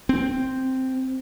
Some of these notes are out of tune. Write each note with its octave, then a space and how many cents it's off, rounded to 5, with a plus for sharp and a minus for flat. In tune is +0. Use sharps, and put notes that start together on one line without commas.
C4 +0